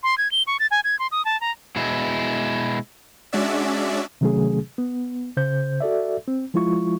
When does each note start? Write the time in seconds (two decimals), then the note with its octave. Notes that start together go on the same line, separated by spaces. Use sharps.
0.03 C6
0.18 G#6
0.32 G7
0.47 C#6
0.60 A6
0.71 G#5
0.84 G#6
0.99 C6
1.12 D#6
1.25 A5
1.41 A#5
1.76 B2 G#3 E4
3.32 G#3 C#4 D4 F#4 D5 E5
4.21 C3 D#3 F#3 A3 C#4 G#4
4.78 B3
5.37 C#3 C5 G6
5.80 F#4 A4 D5 E5
6.28 C4
6.54 F3 G#3 E4 F4 C#6